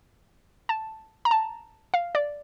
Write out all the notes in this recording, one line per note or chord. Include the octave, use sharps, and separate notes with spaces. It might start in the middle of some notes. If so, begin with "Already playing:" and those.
A5
A#5
A5
F5
D5